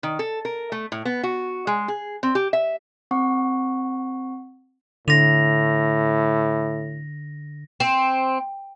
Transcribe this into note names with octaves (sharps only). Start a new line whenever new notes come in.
D#3
A4
A#4
A3
A2
B3
F#4
G#3
G#4
C4
G4
E5
C4 F#5 C#6
A2 D3 A#6 F7
C4